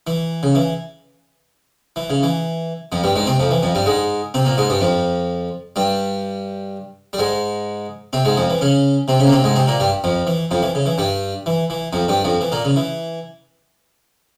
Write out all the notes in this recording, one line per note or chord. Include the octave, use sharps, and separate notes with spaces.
E3
C#3
E3
E3
C#3
E3
F2 F3
G2 G3
G#2 G#3
C3 C4
F2 F3
E3
F2 F3
G2 G3
G#2 G#3
C3 C4
A#2 A#3
G#2 G#3
G2 G3
F2 F3
G2 G3
G3
G#2 G#3
C3 C4
G#2 G#3
F2 F3
E3
C#3 C#4
C3 C4
C#3 C#4
A#3
C3 C4
G#2 G#3
C3 C4
A#2 A#3
G2 G3
F2 F3
E3
F2 F3
E3
C#3
E3
G2 G3
E3
E3
F2 F3
G2 G3
F2 F3
E3
A#2 A#3
C#3
E3